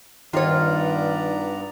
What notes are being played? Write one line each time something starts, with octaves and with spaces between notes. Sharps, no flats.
G2 D#3 B3 F4 C#5 D5 A#5